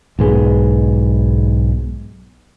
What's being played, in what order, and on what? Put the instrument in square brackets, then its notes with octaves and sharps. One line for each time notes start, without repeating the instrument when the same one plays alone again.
[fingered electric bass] B1 G#2 G#3 B3